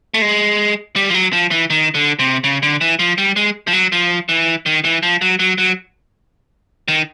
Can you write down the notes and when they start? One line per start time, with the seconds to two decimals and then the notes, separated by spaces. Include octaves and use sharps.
0.14 A3
0.22 G#3
0.96 G3
1.09 F3
1.14 F#3
1.33 F3
1.51 E3
1.70 D#3
1.94 D3
2.19 C3
2.44 C#3
2.63 D3
2.81 E3
2.99 F3
3.18 G3
3.36 G#3
3.67 F3
3.73 F#3
3.92 F3
4.29 E3
4.66 D#3
4.84 E3
5.03 F3
5.21 F#3
5.39 F#3
5.58 F#3
6.88 D#3